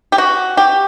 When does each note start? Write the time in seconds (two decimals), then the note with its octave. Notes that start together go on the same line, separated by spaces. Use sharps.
0.12 G4
0.18 F#4
0.57 G4